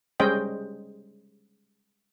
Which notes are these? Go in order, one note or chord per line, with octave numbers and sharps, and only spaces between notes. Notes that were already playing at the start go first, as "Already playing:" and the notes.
G3 G#3 C#4 C5 D#5 G5